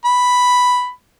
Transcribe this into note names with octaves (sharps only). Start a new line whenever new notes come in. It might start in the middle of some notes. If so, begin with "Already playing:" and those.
B5